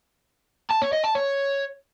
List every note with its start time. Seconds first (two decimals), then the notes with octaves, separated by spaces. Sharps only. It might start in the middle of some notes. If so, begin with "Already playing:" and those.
0.70 A5
0.82 C#5
0.93 D#5
1.04 A5
1.15 C#5